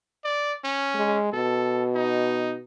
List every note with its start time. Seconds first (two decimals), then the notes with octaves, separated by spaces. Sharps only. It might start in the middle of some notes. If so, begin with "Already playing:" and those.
0.25 D5
0.64 C#4
0.95 G#3
1.33 B2 A4
1.95 D#4